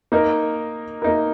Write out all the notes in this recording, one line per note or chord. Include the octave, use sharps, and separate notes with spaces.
A#3 D#4 A#4
A#3 D#4 A#4